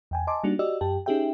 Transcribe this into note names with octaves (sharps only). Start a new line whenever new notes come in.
E2 G5 G#5
D#5 G#5 A5 C6 D6
G3 A#3 D4 D#4 F#4
F#4 G4 D5 D#5 E6
F#2 G4 G5 A5
C#4 D#4 G4 G#4 E5 G5